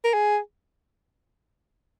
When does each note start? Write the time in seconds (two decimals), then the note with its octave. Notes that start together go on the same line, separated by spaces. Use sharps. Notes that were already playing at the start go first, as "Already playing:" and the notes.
0.04 A#4
0.14 G#4